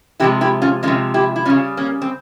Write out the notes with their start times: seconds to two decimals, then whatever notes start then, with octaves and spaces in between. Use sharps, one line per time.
0.20 C3 F3 G#3 E4 G4
0.41 E4 G4
0.62 C#4 F4
0.83 C3 F3 G#3 C#4 F4
1.14 E4 G4
1.36 E4
1.45 C#3 G3 C#4 F4
1.77 A#3 C#4
2.02 C4